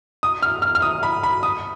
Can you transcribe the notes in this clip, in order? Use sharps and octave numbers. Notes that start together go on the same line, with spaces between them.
D#6
F6
F6
F6
D#6
B5
B5
D#6